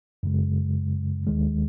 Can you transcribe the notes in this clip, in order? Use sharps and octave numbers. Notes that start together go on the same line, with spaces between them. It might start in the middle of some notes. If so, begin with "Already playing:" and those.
F#2 C#3 G#3
D#2 D#3 G#3